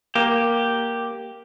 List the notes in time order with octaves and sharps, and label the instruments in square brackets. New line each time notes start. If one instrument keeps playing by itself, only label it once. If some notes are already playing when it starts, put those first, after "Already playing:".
[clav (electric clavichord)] A#3 [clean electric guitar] G4